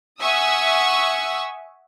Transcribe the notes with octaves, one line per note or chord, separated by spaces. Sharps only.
E5 F#5 G#5 C#6 D#6 E6